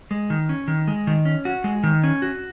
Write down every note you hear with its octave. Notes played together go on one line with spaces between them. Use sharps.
G#3
D#3
C#4
D#3
G#3
D#3
C#4
F#4
G#3
D#3
C#4
F#4